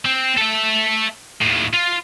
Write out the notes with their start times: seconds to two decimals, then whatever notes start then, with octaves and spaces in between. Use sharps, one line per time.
0.05 C4
0.37 A4 E5
1.41 D#2 A2
1.73 F4